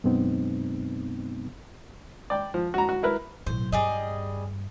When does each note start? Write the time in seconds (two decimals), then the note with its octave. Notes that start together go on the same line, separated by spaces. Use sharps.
0.04 F#2 B2 G#3 B3 C4 D#4
2.30 D5 G5
2.54 F3
2.74 F#4 A#5
2.89 F#4
3.03 E4 A#4 B4
3.47 B1 A2 C5
3.72 G2 G3 G#4 D#5